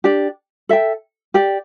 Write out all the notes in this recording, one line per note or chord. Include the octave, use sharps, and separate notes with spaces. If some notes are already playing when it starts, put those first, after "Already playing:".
D4 G4 D5 G5
A4 E5 G5
G4 D5 G5